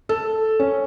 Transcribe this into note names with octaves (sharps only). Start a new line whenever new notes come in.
A4
C#4